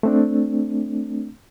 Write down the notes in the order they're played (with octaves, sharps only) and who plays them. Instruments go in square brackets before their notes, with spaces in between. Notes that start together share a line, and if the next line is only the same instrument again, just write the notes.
[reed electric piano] A3 C4 D4